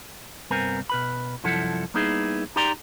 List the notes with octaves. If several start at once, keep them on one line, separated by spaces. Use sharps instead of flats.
C2 G2 B3 C4 A#4 G#5
B2 B4 B5
C2 F#2 F3 E4 A4 F#5
G3 A#3 B3 D#4 E4 G#4
D#4 G4 D5 G5 A#5 C6